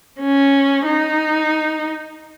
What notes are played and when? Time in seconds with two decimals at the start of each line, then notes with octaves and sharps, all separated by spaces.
0.20 C#4
0.85 D#4